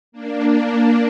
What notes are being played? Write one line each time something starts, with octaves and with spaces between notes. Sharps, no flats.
A#3 D4